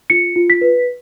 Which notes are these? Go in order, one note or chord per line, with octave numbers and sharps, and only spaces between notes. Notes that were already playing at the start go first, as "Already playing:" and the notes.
F4 C#7
F4
B6
B4